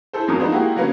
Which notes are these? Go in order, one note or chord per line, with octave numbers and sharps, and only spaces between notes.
E4 G#4 A4 C5
G#1 F2 F#3 A3 A#4 D#6
F3 G#3 B3 D4 D#4
G#3 A#3 E4 F#4 G4
D3 F#3 A#3 B3 C#4